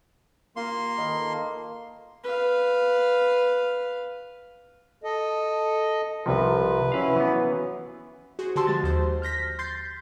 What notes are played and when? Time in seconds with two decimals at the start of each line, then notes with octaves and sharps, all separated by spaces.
0.56 A#3 F4 G4 C6
0.98 D#3 D#4 B4
1.11 A4
2.24 B4 F5
5.04 A4 D#5
6.26 C2 C3 F3 B4
6.92 F#3 C#4 E4 B4 F5
7.16 E3 B3
8.39 F#4 G#4 C5
8.56 D3 F#4 G4 A5 C6 E6
8.67 F3 G#3 A6
8.84 D#2 C5
9.22 F6 G6 A#6 B6
9.59 C6 G6 A6 C7